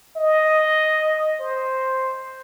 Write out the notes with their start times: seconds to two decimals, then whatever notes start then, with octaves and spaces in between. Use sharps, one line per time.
0.16 D#5
1.40 C5